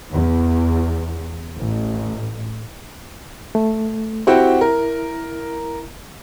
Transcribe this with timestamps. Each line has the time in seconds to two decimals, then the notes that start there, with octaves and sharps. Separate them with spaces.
0.12 E2
1.57 A1
3.55 A3
4.27 C4 E4 F#4 G4
4.61 A#4